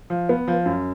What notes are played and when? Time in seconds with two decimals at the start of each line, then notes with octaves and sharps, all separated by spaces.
0.10 F3
0.29 B3
0.48 F3
0.66 F#2